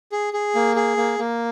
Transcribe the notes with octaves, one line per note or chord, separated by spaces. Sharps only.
G#4
G#4
A#3
G#4
A#3
A#3